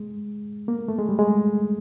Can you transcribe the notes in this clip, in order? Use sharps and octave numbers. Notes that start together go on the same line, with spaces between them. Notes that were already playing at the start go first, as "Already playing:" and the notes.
Already playing: G#3
A#3
A3
G#3
G3
G#3